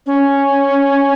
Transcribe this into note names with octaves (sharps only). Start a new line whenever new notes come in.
C#4